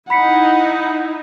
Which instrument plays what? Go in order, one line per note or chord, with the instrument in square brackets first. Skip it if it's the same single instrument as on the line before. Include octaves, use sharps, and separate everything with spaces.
[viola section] D#4 E4 [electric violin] F#5 [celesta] B5 B6 C#7